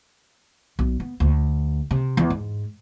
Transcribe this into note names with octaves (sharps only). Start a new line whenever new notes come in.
B1
B3
D2
C3
E2
G#2